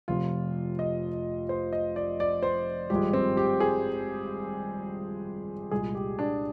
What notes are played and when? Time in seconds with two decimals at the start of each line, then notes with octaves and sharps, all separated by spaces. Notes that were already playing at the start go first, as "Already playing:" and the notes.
0.08 F1 F2 C3 F3 F4
0.79 D#5
1.49 C5
1.73 D#5
1.96 D5
2.20 D5
2.43 C5
2.90 G#1 G2 F3 G#3 G4
3.13 C4
3.37 G4
3.60 G#4
5.71 C2 A#2 G#3 G#4
5.95 G4
6.19 D4